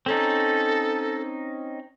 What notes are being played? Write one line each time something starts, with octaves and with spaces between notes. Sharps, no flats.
C4 C#4 D#4 A4